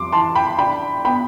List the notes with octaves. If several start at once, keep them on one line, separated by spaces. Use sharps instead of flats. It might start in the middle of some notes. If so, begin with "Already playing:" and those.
Already playing: F2 G3 C6 D6
E3 A5 C6
G5 B5
D4 G5 B5
B3 G5 B5